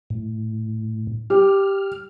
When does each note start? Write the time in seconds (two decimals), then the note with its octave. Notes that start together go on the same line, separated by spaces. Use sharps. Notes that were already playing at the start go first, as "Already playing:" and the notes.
0.10 A2
1.30 G4 F6